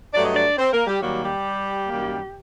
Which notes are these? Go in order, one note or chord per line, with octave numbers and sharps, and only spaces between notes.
G2 F#3 A3 D5
D#5
D4 D5
C4 C5
A#3 A#4
G3 G4
D#2 D#3 F#3 G3 A#3 F#4
G3 G4
F#2 D#3 G3 A#3